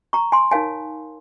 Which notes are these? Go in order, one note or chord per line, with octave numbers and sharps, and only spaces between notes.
A#5 C#6
G#5 C6
D#4 A#4 C#5 F5 G#5